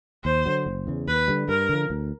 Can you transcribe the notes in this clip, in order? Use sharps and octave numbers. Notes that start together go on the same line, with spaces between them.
D#2 C5
D3 F#3
F#1
E2 C#3
D#2 B4
D3 G3
G2 A#4
D3 F3
D2